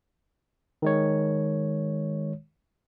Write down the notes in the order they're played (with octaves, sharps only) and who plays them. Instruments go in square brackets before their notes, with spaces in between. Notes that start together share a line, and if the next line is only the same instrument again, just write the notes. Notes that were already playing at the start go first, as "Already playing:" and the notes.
[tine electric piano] D#3 G#3 C#5